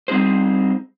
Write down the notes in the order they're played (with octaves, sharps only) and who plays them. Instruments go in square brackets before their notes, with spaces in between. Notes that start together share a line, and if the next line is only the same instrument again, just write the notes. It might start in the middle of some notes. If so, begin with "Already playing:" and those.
[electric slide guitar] G3 C4 D#4 G#4 C5